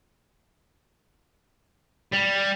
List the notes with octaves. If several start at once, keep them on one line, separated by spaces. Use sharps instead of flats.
G3